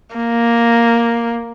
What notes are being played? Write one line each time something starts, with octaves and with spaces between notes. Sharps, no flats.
A#3